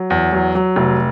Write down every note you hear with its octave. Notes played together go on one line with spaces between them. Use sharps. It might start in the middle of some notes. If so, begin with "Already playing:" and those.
Already playing: F#3
E2
F#3
F#3
F1